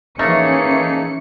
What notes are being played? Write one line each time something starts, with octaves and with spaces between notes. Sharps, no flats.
E3 A3 A#3 C#4 D#4 G#4 A#4 C#7